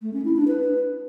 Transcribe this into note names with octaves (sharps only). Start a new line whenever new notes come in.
A3
C#4
E4
D4
B4